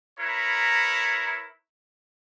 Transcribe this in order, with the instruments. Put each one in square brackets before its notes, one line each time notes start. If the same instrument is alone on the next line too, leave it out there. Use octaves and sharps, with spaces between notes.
[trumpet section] E4 A#4 B4 C#5 A#5